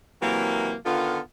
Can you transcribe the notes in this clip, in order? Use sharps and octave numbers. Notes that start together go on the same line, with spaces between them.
C3 E3 F#3 A#3
D3 D#3 B3 F4